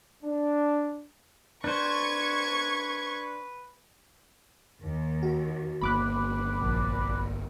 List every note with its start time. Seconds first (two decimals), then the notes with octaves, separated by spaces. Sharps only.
0.23 D4
1.64 D4 B4 C5 C#6 G#6
4.81 D#2
5.23 F#4
5.82 G1 A#3 B5 D6 F#6
6.61 A#1 A#2